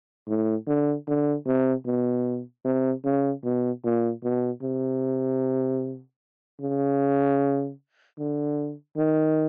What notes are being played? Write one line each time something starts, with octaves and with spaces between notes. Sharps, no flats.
A2
D3
D3
C3
B2
C3
C#3
B2
A#2
B2
C3
C#3
D3
D#3